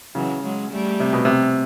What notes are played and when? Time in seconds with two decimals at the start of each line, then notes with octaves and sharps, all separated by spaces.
0.15 C#3 E3 F#3
0.43 F#3 G#3
0.71 G3 A3
1.00 C3
1.13 B2
1.25 C3